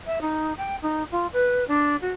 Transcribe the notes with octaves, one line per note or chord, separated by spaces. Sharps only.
E5
D#4
G5
D#4
F4
B4
D4
F#4